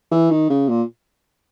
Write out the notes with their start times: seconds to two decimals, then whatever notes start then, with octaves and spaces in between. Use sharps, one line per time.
0.11 E3
0.30 D#3
0.49 C#3
0.69 A#2